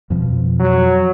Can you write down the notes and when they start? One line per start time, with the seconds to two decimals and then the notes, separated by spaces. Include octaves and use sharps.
0.10 F2 B2 F3
0.59 F#3